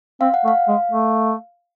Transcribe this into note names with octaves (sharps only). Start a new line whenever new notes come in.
C4 F5
F#5
A3
F5
G#3
A3